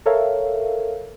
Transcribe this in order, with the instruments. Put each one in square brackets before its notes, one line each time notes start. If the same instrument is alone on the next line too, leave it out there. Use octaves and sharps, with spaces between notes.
[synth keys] A4 A#4 C#5 E5 F5